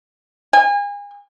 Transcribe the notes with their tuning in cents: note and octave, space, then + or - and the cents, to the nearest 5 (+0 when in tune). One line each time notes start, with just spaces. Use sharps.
G#5 -35